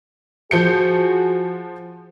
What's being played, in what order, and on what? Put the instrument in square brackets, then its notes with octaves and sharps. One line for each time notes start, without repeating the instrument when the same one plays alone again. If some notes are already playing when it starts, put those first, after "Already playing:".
[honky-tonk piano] F3 G6 C#7 [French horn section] F#4 G#4